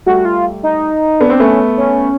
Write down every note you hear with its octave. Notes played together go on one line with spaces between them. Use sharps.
G3 A3 F#4
F4
D#4
B3 D4
C4
A3 B3 C#4
C#4